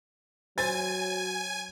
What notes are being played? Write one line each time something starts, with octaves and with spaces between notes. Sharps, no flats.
F#3 C5 G#5 A6